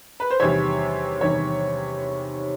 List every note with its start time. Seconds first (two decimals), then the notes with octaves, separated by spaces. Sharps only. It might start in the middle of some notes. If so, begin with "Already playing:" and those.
0.20 B4
0.30 C5
0.40 E2 C3 D#3 G3 C#5
1.21 E2 C3 D#3 G3 C#5